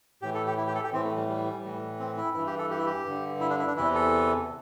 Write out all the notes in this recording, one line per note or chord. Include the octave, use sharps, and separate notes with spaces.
A2 E3 G4
A4
G4
E4
G4
A4
G4
A2 E3 C4
A3
G3
G3
A2 E3
C4
E4
G2 E3 E4
G4
A4
G4
E4
G4
G2 D3
E4
D4
E4
D4
E2 C3 E3 E4
A4